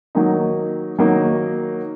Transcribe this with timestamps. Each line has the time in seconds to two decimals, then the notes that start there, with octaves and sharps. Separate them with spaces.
0.15 D#3 F#3 A#3 D#4
0.99 D#3 F#3 A#3 D#4